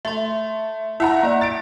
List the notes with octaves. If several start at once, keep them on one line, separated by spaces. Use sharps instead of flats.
A3 E5 C6
E4 E5 F#5 A#5
A#3 D5
A6 D7